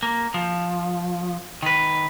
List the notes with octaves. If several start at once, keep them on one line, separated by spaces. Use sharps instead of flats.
A#3
F3
D#3 B4